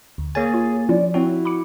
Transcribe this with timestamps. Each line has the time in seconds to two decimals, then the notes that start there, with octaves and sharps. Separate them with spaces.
0.18 D2
0.35 A#3 G#4 C#5 G#5 A6
0.54 F4
0.89 F3 C#4 E4 F4 D5
1.14 C4 E4 F#4 C#5 G5
1.45 B5 D6 C#7